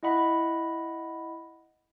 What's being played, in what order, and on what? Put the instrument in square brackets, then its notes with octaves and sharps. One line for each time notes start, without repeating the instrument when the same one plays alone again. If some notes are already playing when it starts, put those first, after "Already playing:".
[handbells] E4 D#5 F#5 B5